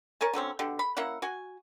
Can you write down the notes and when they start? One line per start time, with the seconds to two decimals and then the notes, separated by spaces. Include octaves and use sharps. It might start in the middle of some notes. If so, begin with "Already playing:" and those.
0.21 A#4 C#5 G#5 A5
0.33 D3 F#3 C4 C#4
0.59 B2 D3 G4
0.79 B5
0.97 A#3 C#4 E4 F#5
1.22 F#4 G#5